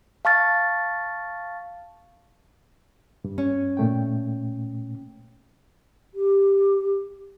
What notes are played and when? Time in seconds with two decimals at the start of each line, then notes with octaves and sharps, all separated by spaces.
0.25 F5 A5 C#6 F6 A6
3.24 G2
3.38 C#4
3.77 A#2 A3 G5
6.14 G4